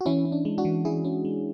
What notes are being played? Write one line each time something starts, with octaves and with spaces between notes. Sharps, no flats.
F#4
E3 C#4 E4
C#4
D4
G#3
D4 F#4
E3
E3 E4 G#4
C#4
G#3